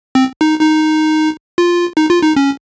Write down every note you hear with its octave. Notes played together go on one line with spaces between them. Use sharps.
C4
D#4
D#4
F4
D#4
F4
D#4
C#4